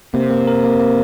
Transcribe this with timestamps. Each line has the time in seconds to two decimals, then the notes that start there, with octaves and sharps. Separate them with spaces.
0.14 C3 A#3
0.30 A#3
0.47 A#4
0.64 A#3
0.79 A#3